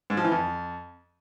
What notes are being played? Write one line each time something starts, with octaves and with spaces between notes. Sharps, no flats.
G#2
F3
E3
F2